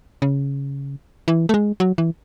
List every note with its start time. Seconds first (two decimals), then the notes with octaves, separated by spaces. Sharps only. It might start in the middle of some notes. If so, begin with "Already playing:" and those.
0.22 C#3
1.28 E3
1.49 A3
1.54 G#3
1.80 F#3
1.98 E3